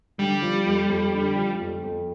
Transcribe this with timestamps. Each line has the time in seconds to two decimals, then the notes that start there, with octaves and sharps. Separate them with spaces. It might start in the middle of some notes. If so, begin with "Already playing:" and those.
0.19 D3 G3
0.42 F3
0.66 F2
0.89 F2
1.13 D3
1.36 F3
1.59 F2
1.84 F2